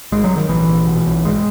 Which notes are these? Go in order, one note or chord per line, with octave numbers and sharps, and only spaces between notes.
G#1 G#3
F#3
G#1
D#3
A#1 E3
A#1
B2
B1
G#1 G#3